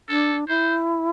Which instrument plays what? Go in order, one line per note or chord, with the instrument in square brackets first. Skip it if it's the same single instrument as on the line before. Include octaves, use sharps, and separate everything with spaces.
[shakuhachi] D4 [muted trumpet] A4
[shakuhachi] E4 [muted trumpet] C5